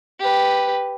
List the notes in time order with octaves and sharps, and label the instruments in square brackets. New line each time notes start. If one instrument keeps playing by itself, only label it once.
[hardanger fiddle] G4 B4